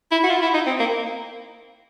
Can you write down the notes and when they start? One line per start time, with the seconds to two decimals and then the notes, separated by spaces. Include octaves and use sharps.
0.11 E4
0.24 F#4
0.30 F4
0.42 E4
0.54 D#4
0.66 C4
0.80 A#3